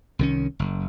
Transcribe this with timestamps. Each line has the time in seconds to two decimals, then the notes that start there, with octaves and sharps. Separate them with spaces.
0.19 C2 D#3 C#4
0.59 F#1